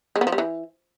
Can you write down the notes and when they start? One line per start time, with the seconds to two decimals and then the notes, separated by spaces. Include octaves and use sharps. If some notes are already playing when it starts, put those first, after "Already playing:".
0.16 G#3
0.21 B3
0.27 F3
0.32 G3
0.38 E3